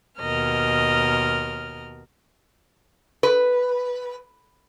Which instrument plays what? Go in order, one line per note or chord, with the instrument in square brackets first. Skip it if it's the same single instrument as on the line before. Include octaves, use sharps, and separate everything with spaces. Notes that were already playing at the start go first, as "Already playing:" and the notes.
[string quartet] D#2 B2 A#4 D#5 F6
[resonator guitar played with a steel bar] B4